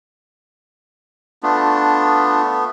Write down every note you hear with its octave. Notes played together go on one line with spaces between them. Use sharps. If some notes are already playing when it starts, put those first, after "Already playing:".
A3 B3 D4 F4